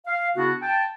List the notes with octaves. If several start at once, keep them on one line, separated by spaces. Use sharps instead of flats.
F5
C#3 B3 D4 E4 F#4
G5 A5